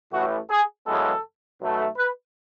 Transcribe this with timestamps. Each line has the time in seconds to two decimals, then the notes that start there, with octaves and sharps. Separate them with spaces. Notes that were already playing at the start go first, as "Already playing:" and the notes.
0.12 A1 A2 E3 A3 F#4
0.50 G#4
0.86 F#2 C#3 E3 G#3 B3 A4
1.60 B1 B2 F#3 A3
1.97 B4